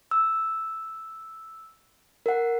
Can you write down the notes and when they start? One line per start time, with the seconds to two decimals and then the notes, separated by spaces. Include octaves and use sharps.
0.11 E6
2.26 A#4 F#5